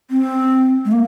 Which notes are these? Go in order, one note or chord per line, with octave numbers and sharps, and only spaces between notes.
C4
G#3
A#3